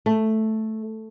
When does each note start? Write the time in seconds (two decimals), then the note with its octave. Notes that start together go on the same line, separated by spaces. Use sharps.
0.06 A3